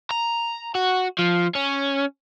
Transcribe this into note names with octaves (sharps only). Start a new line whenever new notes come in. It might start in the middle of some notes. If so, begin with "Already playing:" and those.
A#5
F#4
F3
C#4